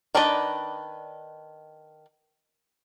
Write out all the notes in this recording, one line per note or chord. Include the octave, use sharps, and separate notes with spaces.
D#3 D4 B4 D5 D#5